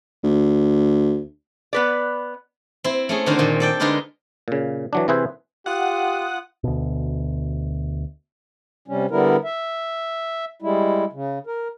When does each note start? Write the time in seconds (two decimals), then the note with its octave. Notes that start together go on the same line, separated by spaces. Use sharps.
0.23 D2
1.73 B3 B4 D5
2.84 C4 E4
3.09 A3 C#4 G#4
3.26 D3 D#3 C4 F#4 A#4 C5
3.39 A#2 D#3
3.60 A4 D5 G5
3.80 D3 G#3 D#4 A#4 B4 D5
4.48 A#2 C#3
4.93 E3 F#3 D4
5.08 C3 E3 E4 G#4 B4 C5
5.66 F4 G4 F#5 D#6
6.64 D2 B2
8.88 C3 G3 C#4
9.11 D3 G3 B3 E4 A#4
9.44 E5
10.62 G3 G#3 E4
11.13 C#3
11.47 A#4